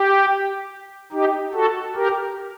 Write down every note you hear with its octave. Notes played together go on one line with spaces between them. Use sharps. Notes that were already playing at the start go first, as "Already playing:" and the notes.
Already playing: G4
D#4 G4
F#4 A4
G4 A#4